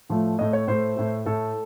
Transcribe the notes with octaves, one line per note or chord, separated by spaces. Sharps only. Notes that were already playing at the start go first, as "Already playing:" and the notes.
A2 F3 A3
A2 A3 D#5
C#5
A2 A3 C5
A2 A3
A2 A3 A4